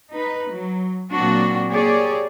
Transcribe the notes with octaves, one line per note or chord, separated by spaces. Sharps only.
D#4 B4
F#3
A#2 F#3 A#3 C4 D4 F#4
A#3 G4 G#4 C#5 D5